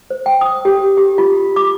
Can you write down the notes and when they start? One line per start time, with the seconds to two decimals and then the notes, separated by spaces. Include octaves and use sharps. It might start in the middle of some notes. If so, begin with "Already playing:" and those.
0.10 C5
0.26 G5
0.41 D#6
0.65 G4
0.97 G4
1.18 F4
1.56 D6